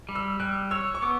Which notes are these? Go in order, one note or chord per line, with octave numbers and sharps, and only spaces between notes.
G3
E6
G3 F#6
C#5 E6
C#6
B3 D6